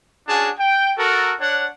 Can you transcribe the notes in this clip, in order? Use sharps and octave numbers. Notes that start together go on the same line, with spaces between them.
C#4 D4 F#4 G#4 F#5 A5
G5
F#4 A4 A#4
D4 C#5 F#5